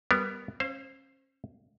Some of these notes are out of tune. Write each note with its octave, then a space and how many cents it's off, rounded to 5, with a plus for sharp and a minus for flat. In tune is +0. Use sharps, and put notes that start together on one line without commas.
G3 +0 B3 +0 A#4 +0
C#4 -35 C5 +5 F5 +0